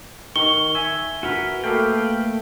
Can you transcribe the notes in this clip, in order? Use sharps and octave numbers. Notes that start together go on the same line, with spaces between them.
D#3 C#6 G7
E5 G#5 E6
F#4 A#4 B4
A3 A#3 A4 B4 F5 G5